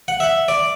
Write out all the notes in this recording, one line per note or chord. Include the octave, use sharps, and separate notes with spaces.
F#5
E5
D5